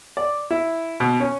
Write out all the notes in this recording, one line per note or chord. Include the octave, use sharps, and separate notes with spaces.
D5
E4
B2
C#4